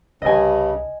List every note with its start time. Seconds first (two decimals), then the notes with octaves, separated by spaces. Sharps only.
0.22 C2 G2 C#3 D#5 G#5